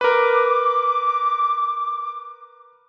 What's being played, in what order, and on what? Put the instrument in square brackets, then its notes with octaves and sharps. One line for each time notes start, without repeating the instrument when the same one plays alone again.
[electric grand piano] A#4 B4 [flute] D6